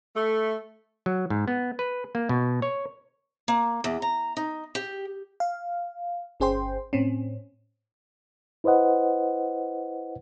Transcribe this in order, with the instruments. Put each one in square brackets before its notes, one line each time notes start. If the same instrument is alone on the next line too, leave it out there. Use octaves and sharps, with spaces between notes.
[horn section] A3
[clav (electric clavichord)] F#3
G#2
B3
B4
A#3
B2
C#5
[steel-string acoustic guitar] A#3
E2
A#5
D#4
G4
[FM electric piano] F5
G1 C#4 G#4 C5 G5 C6
A2 C4 C#4
[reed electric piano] E4 B4 C5 D#5 F#5